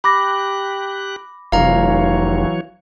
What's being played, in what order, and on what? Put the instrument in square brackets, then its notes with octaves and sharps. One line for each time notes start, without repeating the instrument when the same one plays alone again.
[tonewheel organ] G4 F#6 [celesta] B5 D6 A#6
[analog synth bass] F1 [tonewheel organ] E3 F#3 C#5 [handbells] F5 A#5